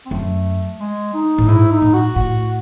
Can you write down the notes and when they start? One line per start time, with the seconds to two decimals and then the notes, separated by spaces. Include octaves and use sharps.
0.06 C4
0.11 F#2 A3
0.80 G#3
1.14 D#4
1.38 A2
1.48 G#2 E4
1.71 D#4
1.82 A2
1.94 F#4
2.16 A2 F#4